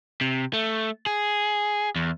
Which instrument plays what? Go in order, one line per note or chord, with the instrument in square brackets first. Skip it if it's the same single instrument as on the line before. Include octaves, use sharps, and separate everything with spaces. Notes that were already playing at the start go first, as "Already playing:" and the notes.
[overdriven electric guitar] C3
A3
G#4
E2